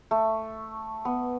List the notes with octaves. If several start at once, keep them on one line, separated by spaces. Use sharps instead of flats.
A3
B3